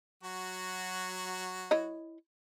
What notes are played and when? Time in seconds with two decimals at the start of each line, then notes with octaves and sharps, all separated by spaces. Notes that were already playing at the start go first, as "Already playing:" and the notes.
0.23 F#3 F#4
1.71 E4 C#5 D#5